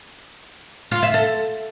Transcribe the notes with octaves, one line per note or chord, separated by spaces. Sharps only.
F4
E5
A4